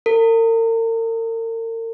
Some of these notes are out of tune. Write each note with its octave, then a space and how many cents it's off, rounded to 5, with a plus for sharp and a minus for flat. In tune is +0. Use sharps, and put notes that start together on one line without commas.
A#4 -40